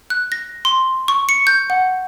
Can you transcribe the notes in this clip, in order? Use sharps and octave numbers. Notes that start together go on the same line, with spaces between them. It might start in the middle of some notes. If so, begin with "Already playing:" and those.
F#6
A#6
C6
C#6
C#7
G6
F#5